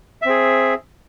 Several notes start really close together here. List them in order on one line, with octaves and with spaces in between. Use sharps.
E5 C4 G#4